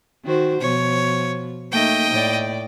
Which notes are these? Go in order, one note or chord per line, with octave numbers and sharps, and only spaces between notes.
D#3 F#4 C5
B2 F3 C#5
A3 A#3 D#4 D#5 G5
A2 D5